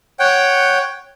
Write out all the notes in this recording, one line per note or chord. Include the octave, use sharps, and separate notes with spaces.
C#5 F#5 G5